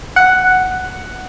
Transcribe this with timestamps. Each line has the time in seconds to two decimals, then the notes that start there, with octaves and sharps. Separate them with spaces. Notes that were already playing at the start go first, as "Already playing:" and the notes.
0.16 F#5